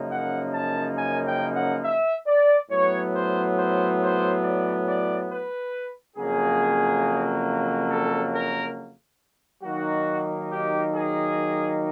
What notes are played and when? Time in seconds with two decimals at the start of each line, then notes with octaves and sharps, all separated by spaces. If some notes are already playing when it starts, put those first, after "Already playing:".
Already playing: F#2 C#3 F3 A#3 D#4
0.11 F#5
0.54 A5
0.97 G#5
1.26 G5
1.54 F#5
1.83 E5
2.27 D5
2.71 A2 F#3 B3 C#5
3.14 C5
3.57 C5
4.00 C5
4.43 D5
4.86 D5
5.30 B4
6.17 F2 C#3 F#3 A#3 G#4
7.90 A4
8.33 A#4
9.63 D#3 F#3 A#3 D#4 F#4
10.50 G4
10.93 G#4